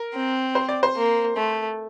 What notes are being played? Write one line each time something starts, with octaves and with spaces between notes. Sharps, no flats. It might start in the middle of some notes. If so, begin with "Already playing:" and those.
Already playing: A#4
C4
C5
D5
C5
A#3
A3